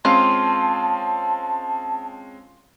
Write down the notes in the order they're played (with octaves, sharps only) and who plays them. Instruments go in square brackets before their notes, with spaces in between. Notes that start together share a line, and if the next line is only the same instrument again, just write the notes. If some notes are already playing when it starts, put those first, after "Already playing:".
[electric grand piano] G#3 C4 C#4 [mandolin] F4 [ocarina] A5